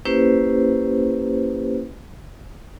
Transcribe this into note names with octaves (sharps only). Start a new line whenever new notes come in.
A#3 C#4 E4 G4 B4 C5